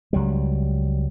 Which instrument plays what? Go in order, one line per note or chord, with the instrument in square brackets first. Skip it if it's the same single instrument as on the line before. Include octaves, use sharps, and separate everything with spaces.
[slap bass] C#2 F#3 G3